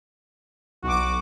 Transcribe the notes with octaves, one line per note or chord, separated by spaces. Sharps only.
B1 F#4 D6